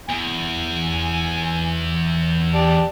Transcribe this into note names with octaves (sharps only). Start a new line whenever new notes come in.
E2 G#5
G4 D5 A5